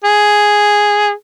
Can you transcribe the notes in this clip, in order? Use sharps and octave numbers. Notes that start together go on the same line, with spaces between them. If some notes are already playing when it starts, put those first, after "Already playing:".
G#4